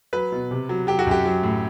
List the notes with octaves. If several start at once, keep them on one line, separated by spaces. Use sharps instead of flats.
F#3 B4
B2
C3
F#3
F#3 G4
F#4
F#2 G4
F#3
A2